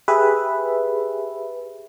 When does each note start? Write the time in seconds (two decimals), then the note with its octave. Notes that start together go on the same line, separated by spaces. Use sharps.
0.08 G4 G#4 B4 E5